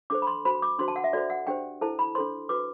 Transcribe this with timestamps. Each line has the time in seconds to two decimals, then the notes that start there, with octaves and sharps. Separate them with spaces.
0.10 D4 A4 C5 D6
0.22 B5
0.27 C6
0.45 F#4 C5 B5
0.62 D6
0.79 D4 F#4 C5 C6
0.88 A5
0.96 F#5
1.04 E5
1.13 F#4 A4 C5 D5
1.30 F#5
1.47 D4 G4 C5 G5
1.81 E4 A4 C5 A5
1.99 B5
2.15 D4 A4 C5 C6
2.49 F#4 B4 D6